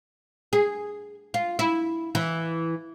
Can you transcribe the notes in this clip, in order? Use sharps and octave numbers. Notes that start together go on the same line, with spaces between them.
G#4
F4
E4
E3